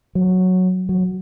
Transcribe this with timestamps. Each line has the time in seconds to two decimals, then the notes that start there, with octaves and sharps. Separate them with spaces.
0.15 F#3
0.89 F#3